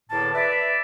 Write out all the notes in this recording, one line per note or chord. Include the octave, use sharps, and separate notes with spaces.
E2 A2 D3 A#3 A5
B4 D5 E5